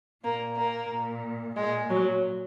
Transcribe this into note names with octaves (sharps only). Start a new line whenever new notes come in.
A#2 A#3
A#3
A#2
A#2 G#3
F#3